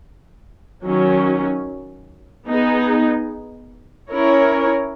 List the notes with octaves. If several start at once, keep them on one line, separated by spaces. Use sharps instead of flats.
D#3 F#3 C#4
B3 D#4 G#4
C#4 E4 A#4 C#5